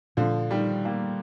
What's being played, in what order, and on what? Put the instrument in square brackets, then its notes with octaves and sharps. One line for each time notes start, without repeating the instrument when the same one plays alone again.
[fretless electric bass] A#2 A3 D4 [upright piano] D3 F3
[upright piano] D#3 G3
G3 A#3